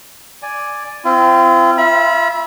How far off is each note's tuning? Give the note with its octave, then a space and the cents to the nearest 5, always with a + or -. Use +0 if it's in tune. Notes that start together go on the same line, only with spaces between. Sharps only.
D5 +0 G#5 +0
C4 -10 F4 -40
F4 -30 E5 +0 B5 -35